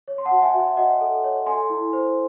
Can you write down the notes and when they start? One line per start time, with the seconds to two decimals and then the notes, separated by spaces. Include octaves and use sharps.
0.08 C#5
0.18 C6
0.25 F#5 A5
0.31 F#4
0.42 E5 G#5
0.54 F#4
0.60 E5
0.77 F#4 D#5 F#5
1.01 A4
1.24 C#5
1.46 A4 G#5 C6
1.70 E4
1.93 C5